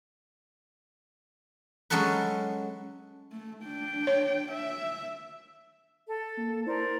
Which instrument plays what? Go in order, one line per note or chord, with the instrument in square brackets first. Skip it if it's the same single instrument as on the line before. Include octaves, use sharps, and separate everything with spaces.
[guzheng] F#3 G#3 C#4 F#4 A4 B4
[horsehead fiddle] A3
D4 G5
[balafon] C#5
[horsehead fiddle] E5
[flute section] A4
[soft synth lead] A#3
[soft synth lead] E4 [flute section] A#4 C5 D5